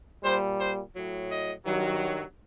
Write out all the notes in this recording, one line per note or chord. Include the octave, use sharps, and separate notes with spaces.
A#2 G3 C5
C5
A2 F#3
D#5
G2 D#3 F#3